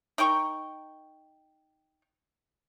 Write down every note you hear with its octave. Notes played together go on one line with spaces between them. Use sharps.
D#4 A#4 G5 C#6